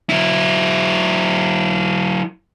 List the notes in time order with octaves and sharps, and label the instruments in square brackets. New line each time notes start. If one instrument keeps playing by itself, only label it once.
[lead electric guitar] F#3 E4